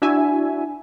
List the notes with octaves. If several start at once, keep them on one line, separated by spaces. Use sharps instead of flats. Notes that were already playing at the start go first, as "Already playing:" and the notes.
D4 E4 F#4 E5 G#5